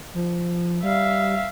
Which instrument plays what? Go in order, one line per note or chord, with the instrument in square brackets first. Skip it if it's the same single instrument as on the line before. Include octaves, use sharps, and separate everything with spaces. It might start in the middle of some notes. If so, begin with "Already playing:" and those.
[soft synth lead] F3
[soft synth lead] G3 [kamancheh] E5 F5